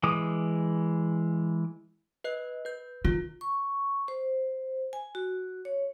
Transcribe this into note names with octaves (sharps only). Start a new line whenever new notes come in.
E3 G#3 D6 D#6
B4 D#5 F#6
B4 G6
D#3 F4
C#6
C5
G#5
F#4
C#5